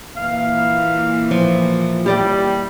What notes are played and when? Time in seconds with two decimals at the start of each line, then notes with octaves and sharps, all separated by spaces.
0.17 A#2 E3 A#3 F5
1.31 F3
2.06 G3 G4 D5 D#5